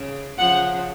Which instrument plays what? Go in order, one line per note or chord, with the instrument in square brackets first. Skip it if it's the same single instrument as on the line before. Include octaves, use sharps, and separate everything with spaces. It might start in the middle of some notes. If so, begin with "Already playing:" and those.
Already playing: [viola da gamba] C#3
[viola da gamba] C#3 F3 [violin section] F#5